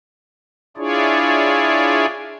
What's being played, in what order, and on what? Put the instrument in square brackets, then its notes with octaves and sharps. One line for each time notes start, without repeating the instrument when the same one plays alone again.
[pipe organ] D4 E4 F4 G#4 C#5 D5